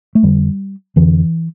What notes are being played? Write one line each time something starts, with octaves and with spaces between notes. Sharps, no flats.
A3
F2 D3 G3
F2 D3 E3